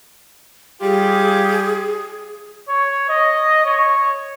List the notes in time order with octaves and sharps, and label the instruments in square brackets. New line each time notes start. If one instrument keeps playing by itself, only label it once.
[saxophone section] G3 F4 G4 [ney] G#4
[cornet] C#5
D#5
C#5